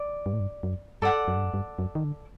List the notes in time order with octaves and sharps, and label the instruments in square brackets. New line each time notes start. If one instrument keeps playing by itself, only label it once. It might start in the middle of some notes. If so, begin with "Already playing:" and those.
Already playing: [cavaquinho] D5
[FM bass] G2
A2
G2
F#2
[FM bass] G2 [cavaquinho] A4 D5 F#5
[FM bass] F#2
G2
F#2
G2
F#2
D#3
D3